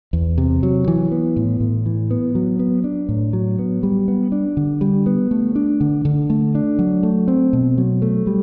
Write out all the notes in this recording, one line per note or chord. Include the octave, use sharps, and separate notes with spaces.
E2
C3
F#3
E3
B3
A2
A2
E3
B3
F#3
B3
D4
A2
F#3
B3
G3
B3
D4
D3
G3
B3
A3
D4
D3
D3
A3
D4
F#3
A3
C4
B2
F#3
A3
G3